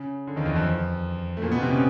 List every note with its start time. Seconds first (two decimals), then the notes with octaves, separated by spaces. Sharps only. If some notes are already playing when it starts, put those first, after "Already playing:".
Already playing: C#3
0.27 D3
0.36 D#2 D#3
0.46 E2 E3
0.55 F2 F3
1.37 A3
1.42 A#2 A#3
1.52 B2 B3
1.62 C3 C4
1.71 C#3 C#4